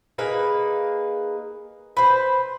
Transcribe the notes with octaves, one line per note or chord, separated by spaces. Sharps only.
A#3 D#4 G#4 B4
B4 C5